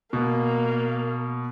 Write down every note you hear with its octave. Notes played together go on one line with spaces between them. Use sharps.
B2 A#3